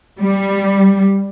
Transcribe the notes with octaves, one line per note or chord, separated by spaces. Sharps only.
G3